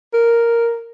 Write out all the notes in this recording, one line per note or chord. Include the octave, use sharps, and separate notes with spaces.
A#4